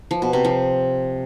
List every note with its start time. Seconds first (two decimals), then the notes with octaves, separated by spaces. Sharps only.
0.11 F3
0.22 B2
0.33 C3
0.44 F3